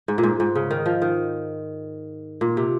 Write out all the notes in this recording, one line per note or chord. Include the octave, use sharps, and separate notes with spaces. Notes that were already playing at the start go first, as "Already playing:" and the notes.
G#2
A#2
G#2
G#2
C#3
D#3
F3
D#3
A#2
C3